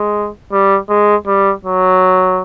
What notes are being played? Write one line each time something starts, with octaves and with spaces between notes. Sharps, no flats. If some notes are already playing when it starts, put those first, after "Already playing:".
Already playing: G#3
G3
G#3
G3
F#3